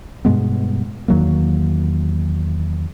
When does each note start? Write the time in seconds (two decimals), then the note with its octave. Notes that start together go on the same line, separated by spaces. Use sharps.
0.25 G2 B2 G#3 B3
1.08 E2 D#3 F#3 A#3